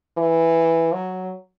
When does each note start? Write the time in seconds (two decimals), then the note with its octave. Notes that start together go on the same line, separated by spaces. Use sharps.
0.17 E3
0.93 F#3